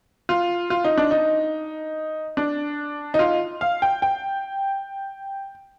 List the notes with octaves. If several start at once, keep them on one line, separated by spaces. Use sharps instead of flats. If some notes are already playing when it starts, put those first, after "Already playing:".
F4
F4
D#4
D4
D#4
D4
D#4
F4
F5
G5
G5